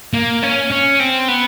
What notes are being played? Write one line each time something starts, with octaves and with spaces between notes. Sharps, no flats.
A#3
C#4
C#4
C4
B3